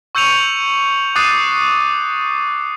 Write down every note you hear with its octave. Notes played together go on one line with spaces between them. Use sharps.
C#6 E6 G6 C#7 D#7 F7
D6 D#6 F#6 A6 C7 D#7